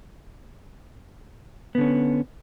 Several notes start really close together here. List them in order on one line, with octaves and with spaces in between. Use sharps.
B3 D3 C#4